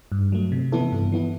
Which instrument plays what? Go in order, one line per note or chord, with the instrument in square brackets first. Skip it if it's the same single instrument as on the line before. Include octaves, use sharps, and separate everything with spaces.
[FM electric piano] G2
F#3 A3
C3
E3 B3 E4 A4
G2
E3 B3 E4